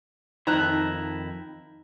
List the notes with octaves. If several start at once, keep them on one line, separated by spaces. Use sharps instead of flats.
F2 D#3 D#4 E4 C5 A5 A#5 F#6